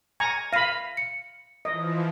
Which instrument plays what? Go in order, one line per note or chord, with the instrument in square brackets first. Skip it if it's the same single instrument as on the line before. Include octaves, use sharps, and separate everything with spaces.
[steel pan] G#5 A#5 C#6 [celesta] G#6
[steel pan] F5 B5 [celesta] A#6 D#7
[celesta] C#7
[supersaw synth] E3 F3 [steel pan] D#5